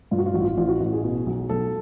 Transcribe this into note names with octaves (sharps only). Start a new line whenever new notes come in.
G2 F4
F#4
F4
A1 F#4
F4
A1 F4
F#4
A1
G#4
B2
B1
B1 A4